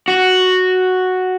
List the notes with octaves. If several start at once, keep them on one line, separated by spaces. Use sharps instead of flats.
F#4